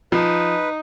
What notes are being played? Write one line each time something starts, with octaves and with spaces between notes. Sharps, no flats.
F3 D#4 B4